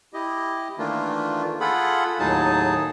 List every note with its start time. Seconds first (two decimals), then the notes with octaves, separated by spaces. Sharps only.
0.13 E4 G4 D#5
0.78 D#3 E3 A3 A#3 D4 F4
1.60 F4 G#4 A4 F#5 B5
2.20 D#2 A2 F#3 D#4 G#4 A5